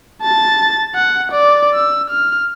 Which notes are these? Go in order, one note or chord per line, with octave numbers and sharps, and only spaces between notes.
A5 A6
F#5
D5
E6
F6